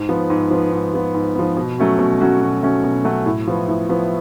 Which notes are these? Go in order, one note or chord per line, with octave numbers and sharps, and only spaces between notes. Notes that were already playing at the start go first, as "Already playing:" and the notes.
Already playing: G#2
F3 B3
G#2
F3 B3
G#2
F3 B3
G#2
F3 B3
B2
F#3 A3 C#4 F#4
B2
F#3 A3 C#4 F#4
B2
F#3 A3 C#4 F#4
B2
F#3 A3 C#4 F#4
A2
F3 B3
A2
F3 B3